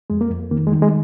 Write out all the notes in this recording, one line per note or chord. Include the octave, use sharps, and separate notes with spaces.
F2 G#3
A#3
F2
D#3 A#3
G#3
D#3
G#3